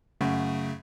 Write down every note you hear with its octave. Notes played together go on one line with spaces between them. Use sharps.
F#2 C#3 A3